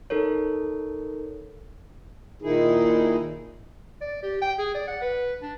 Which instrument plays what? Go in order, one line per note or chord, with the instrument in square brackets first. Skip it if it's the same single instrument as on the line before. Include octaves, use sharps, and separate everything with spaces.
[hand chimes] D#4 A4 A#4 C#5
[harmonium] A#2 D#3 D#4 E4 G#4
[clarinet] D5
G4
G5
G#4
D5
F#5
B4
D4